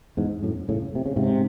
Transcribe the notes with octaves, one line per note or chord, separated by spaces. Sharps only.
E2 G#2
F#2 A2
A2 C#3
C3
C#3
G#2 C3